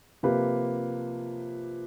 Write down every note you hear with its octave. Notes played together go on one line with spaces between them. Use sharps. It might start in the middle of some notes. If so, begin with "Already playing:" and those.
C3 F3 A#3 G4 B4